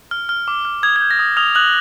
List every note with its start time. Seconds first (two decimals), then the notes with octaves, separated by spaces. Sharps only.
0.11 F6
0.29 F6
0.48 D6
0.65 F6
0.83 D#6 G#6
0.96 G#6
1.01 G6
1.11 A#6
1.19 D#6
1.37 D#6 F6 F7
1.55 D#6 F#6 F#7